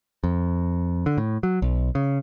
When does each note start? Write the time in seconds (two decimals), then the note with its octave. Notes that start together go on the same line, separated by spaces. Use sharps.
0.24 F2
1.06 D3
1.18 A2
1.43 F#3
1.62 B1
1.95 C#3